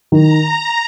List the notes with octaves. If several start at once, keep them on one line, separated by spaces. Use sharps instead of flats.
D#3 A#5